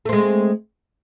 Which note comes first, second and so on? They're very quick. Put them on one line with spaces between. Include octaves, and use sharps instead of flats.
A3 C4 G#3